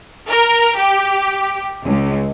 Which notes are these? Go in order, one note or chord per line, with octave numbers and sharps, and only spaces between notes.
A#4
G4
C#2